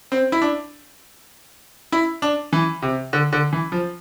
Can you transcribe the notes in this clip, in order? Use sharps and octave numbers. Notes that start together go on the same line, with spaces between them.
C4
E4
D4
E4
D4
E3
C3
D3
D3
E3
F3